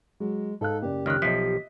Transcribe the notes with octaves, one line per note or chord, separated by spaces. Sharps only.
F#3 G#3
G#2 A4 F5 F#6
F#1 C#3 G4 D5
C#2 D#3 F6 F#6
B1 F3 D#5 E5 B6